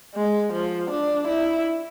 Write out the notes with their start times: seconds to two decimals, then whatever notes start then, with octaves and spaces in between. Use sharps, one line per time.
0.15 G#3
0.52 F3
0.90 D4
1.28 E4